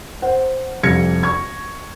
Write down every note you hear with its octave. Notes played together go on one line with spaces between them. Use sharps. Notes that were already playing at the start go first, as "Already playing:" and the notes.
C5 F#5
C2 F2 G#6 A#6 C#7
C#6 G#6